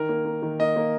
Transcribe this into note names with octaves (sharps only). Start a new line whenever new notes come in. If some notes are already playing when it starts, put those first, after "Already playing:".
Already playing: D#3 A#4
A#3
A#3
D#3
A#3 D#5
A#3